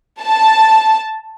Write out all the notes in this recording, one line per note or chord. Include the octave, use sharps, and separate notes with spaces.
A5